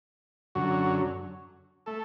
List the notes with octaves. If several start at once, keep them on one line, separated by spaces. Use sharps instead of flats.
F#2 D3 F#3 F#4
A3 A4